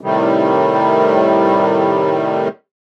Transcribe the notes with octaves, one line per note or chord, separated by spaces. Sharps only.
A2 C3 D#3 G3